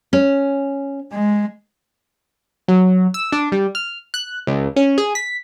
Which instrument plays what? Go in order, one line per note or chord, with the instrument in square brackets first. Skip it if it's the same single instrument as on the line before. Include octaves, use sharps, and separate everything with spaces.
[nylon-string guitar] C#4
[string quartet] G#3
[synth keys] F#3
E6
D4
G3
F6
F#6
C#2
C#4
G#4
B6